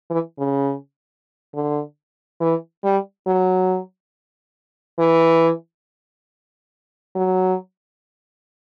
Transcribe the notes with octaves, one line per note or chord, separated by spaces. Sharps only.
E3
C#3
D3
E3
G3
F#3
E3
F#3